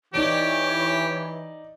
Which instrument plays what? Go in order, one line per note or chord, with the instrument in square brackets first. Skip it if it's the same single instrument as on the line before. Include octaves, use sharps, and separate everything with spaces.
[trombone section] E3 [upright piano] D#4 D5 D7 [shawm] G4 [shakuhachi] C#5